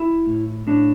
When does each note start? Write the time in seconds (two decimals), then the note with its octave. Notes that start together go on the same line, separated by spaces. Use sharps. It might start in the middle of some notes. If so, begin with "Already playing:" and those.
Already playing: E4
0.26 A2
0.67 A2 D4